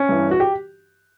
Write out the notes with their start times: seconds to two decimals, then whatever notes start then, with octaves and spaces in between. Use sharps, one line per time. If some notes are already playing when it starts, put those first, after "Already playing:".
Already playing: C#4
0.09 G2 E3
0.31 F#4
0.40 G4